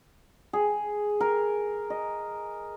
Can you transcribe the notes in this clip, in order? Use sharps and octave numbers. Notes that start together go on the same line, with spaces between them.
G#4
A#4
D#5